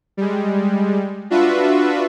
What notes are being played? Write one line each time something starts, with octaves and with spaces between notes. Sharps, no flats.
G3 G#3
D4 F4 F#4 B4 E5